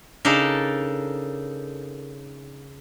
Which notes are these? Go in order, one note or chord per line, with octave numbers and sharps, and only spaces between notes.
C#3 D4 D#4 A4 A#4